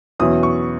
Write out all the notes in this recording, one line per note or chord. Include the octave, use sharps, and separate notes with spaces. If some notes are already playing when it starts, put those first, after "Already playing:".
E2 B2 F#3 C#4 E4 D#6
C#6